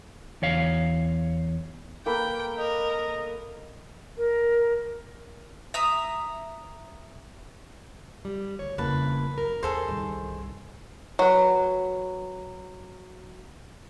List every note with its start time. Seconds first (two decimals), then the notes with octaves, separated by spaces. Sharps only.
0.42 E2 C#5 F5
2.06 A#3 A4 B4 G5
2.58 A#4 D#5
4.17 A#4
5.74 E5 A#5 D#6
8.25 G3
8.59 D2 C#5
8.78 D#1 F2 C#3 A#3 E4 B4 A5
9.38 F#2 A#4
9.63 D#2 G#4 A4 C5
9.88 C2 G2 D#3
11.19 F#3 B4